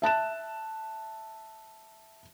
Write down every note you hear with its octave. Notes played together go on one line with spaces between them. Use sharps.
E5 A5 F#6 E7